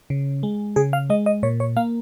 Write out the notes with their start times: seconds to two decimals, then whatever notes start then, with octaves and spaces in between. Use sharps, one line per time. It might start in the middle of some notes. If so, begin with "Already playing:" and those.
0.10 C#3
0.43 G#3
0.76 C#3 G#4
0.93 F5
1.10 G#3 D#5
1.26 D#5
1.43 A#2 C#5
1.60 C#5
1.77 A#3 F5